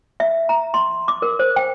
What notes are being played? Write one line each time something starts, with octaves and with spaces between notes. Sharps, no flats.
E5
A#5
C6
D6
A#4
C5
G5